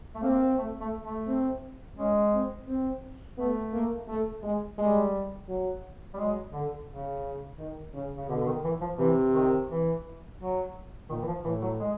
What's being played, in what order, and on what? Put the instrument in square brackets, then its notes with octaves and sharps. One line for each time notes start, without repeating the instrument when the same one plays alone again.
[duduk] A3
[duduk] A#3 [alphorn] C4
[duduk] A3
A3
A3
[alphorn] C4
[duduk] G#3 [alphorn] C#4
[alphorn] C4
C4
[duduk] A3 [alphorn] B3
[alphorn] A#3
A3
G#3
[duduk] G3 [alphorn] G#3
[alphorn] F#3
[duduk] G3
[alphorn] F#3 [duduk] G#3
[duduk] D3
C#3
[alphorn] D#3
C#3
[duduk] C#3
[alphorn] B2 [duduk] D3
[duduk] D3
D#3
E3
F3
[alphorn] C3 [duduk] E3
[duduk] D#3
E3
F#3
[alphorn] A#2 [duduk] D#3
[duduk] E3
F3
[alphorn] A2 [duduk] E3
[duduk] F#3
G#3